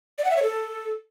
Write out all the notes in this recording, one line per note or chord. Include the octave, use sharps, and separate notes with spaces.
D5
F#5
E5
C#5
A4